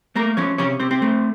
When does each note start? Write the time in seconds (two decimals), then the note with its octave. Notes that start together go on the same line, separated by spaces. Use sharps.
0.15 A3 A#3 A#4
0.37 F3 C#4 C#5
0.58 C3 C#4 C#5
0.80 C3 C4 C5
0.91 C4 C5
1.02 A3